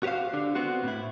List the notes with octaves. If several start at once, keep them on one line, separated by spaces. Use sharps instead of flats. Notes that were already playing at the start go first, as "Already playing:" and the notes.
F#4 G4 B4 C5 F5
D3 D4
B3 C4 F#4
A2 E4